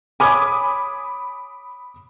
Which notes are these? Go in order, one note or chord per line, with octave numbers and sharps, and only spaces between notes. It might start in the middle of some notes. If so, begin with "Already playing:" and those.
C#5 G#5 B5 D6 D#6